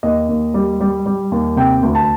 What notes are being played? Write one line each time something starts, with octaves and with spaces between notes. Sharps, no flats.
D#2 D#5
D#2
G3
G3
G3
D#2
C3 G5
D2
A5